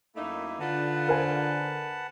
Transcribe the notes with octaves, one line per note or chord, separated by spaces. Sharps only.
F#2 A3 A#3 D#4 E4
D3 D#4 F4 B4 F#5 A5
A#4 C5 G#5